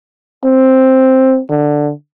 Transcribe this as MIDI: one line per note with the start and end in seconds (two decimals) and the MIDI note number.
0.44 1.41 60
1.50 1.91 50